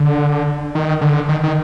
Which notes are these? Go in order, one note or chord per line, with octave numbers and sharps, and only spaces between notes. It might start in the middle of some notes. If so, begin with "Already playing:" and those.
Already playing: D3
D#3
D3
D#3
D#3